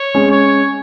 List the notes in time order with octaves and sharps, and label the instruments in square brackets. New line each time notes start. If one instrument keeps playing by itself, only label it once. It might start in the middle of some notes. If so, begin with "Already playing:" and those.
Already playing: [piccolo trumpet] C#5
[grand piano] G#3 C#4
[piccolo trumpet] C#5